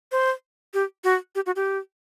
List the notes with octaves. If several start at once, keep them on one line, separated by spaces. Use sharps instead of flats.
C5
G4
F#4
G4
F#4
G4